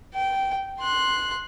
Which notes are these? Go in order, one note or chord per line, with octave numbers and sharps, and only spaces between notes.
G5
C6 F#6